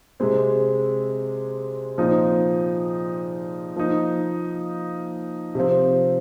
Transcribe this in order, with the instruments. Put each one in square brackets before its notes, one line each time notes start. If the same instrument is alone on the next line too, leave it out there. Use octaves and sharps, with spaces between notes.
[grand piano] C3 G#3 C4
A#2 F3 C4 D#4
F3 A#3 D#4
C3 F3 C4